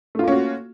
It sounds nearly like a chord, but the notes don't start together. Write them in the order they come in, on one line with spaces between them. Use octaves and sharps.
A3 F4 A#3 C#4 F#4